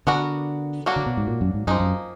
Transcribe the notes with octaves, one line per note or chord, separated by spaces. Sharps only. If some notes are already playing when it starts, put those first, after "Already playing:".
D3 B3 D4 F#4 A#4
F#3 A#3 D4 F#4
D3
B2
G#2
A#2
F#2
G#2
F#2 F3 A#3 D#4 G#4
F#2